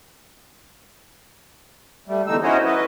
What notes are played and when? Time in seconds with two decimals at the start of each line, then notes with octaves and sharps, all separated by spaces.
2.08 G3 A3
2.27 E2 D3 E3 D#4 E6
2.43 C#4 E4 F#4 C5 C#5 D#5
2.65 B4 D#5